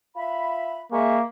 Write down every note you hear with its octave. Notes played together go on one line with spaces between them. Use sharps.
F4 E5 B5
G#3 A#3 E5 C#6